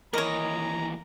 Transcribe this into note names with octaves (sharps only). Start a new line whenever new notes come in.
D#2 E3 A#4 C#5 D#5 A#5